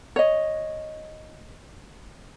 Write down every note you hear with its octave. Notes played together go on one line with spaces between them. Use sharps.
C#5 D#5